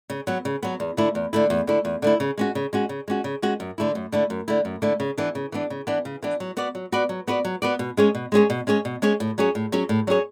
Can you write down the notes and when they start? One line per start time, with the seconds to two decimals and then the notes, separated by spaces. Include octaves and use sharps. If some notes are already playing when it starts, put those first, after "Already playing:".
0.10 C#3
0.27 F#3 B3
0.45 C#3
0.63 F#3 B3
0.80 E2
0.97 D3 A3 E4
1.15 E2
1.33 D3 A3 E4
1.50 E2
1.67 D3 A3 E4
1.85 E2
2.02 D3 A3 E4
2.20 C#3
2.38 G#3 C#4 F#4
2.55 C#3
2.73 G#3 C#4 F#4
2.89 C#3
3.08 G#3 C#4 F#4
3.24 C#3
3.42 G#3 C#4 F#4
3.60 F#2
3.78 D3 A3 E4
3.95 F#2
4.12 D3 A3 E4
4.30 F#2
4.48 D3 A3 E4
4.65 F#2
4.82 D3 A3 E4
5.00 C#3
5.18 E3 B3 D4
5.35 C#3
5.52 E3 B3 D4
5.70 C#3
5.87 E3 B3 D4
6.05 C#3
6.23 E3 B3 D4
6.40 F#3
6.57 B3 F#4 B4 D5
6.75 F#3
6.92 B3 F#4 B4 D5
7.09 F#3
7.27 B3 F#4 B4 D5
7.45 F#3
7.62 B3 F#4 B4 D5
7.79 B2
7.97 G#3 C#4 G#4 C#5
8.15 B2
8.32 G#3 C#4 G#4 C#5
8.50 B2
8.67 G#3 C#4 G#4 C#5
8.85 B2
9.02 G#3 C#4 G#4 C#5
9.20 A2
9.38 F#3 C#4 G#4 C#5
9.55 A2
9.72 F#3 C#4 G#4 C#5
9.89 A2
10.07 F#3 C#4 G#4 C#5